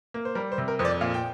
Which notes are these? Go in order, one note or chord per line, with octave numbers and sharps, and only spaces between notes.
A#3
C5
G3 A#4
C5
C3
A#4
F2 C5
D5
A#2 F5
G5